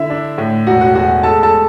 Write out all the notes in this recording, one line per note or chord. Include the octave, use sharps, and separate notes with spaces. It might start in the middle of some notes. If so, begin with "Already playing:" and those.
Already playing: D3 E4 E5
D4
A2
E1 F#4 F#5
F#4 F#5
E2 F#4 F#5
G#3 A4 A5
A4 A5